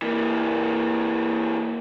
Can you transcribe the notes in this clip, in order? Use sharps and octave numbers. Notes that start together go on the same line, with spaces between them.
E3 A#3